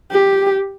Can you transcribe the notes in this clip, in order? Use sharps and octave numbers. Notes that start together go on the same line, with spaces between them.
G4